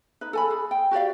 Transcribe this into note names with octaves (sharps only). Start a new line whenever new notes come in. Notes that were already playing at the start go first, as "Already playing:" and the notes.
D#4 B4
A4 G#5 B5
G#4
G5
F#4 G4 D5 F5